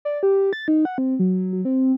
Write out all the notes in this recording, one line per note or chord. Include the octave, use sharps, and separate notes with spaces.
D5
G4
A6
D#4
F#5
C4
F#3
F#3
C4